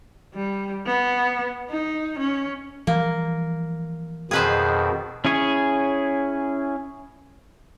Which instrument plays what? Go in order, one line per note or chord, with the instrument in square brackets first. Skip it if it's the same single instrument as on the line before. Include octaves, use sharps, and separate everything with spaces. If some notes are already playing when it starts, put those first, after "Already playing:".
[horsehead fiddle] G3
B3
D#4
C#4
[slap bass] E3 F3 G3 [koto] A#3
[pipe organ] F2 B2 D#3 [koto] G#4 B4 C5
[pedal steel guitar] C#4 E4 G#4 C#5